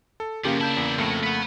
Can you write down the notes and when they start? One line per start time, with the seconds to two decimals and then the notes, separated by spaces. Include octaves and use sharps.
0.20 A4
0.45 F#2 C#3 F3 A#3 G4
0.61 D4 E4 A5 G6
0.77 E2
0.98 F2 A2 A3 C#7
1.24 B4 F#5